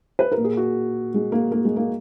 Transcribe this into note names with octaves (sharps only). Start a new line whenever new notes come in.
B4
A#4
A#2
G#4
F#4
G#3
A#3
A#3
G#3
A#3